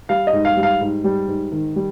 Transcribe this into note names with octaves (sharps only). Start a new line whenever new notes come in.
G3 F5
D#5
G#2
F5
G3
F5
G#2
G3
G#2
D#3
G3